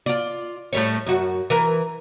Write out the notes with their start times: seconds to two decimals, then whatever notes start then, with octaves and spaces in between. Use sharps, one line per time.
0.06 F4 D5
0.73 A2 G3 C#5
1.06 F#2 F#4
1.50 E3 A#4